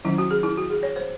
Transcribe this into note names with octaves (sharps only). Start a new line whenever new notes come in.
D#3 F#3 C#4 E4
F#4
G#4
E4
F#4
G#4
C#5
C5